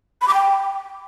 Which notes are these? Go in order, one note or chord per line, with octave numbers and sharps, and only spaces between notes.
B5
D6
G5